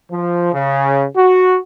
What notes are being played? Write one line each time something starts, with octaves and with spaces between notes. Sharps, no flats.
F3
C#3
F#4